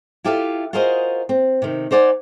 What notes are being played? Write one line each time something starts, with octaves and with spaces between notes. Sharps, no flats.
E4 F4 G4 A4 E5 F5
F4 F#4 G#4 A#4 C5 D#5
C4
C3 D#3
D#4 C5 D5 F#5 G#5